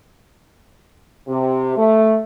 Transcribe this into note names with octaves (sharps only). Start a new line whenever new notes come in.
C3
A3